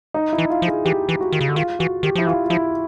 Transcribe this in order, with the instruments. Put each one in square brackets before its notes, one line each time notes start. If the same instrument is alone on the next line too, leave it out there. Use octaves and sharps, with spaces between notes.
[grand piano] D#4
E4
[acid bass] E3
[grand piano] F4
[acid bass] F3
[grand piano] G#4
[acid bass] E3 [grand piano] G4
[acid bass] E3
[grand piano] F#4
[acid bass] D#3
C#3
D3
[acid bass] D#3 [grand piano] F4
[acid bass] E3 [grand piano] F#4
[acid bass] D#3 [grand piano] G4
[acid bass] F3 [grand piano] E4
[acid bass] E3 [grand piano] F4
[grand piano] F4
[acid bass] F3 [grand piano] E4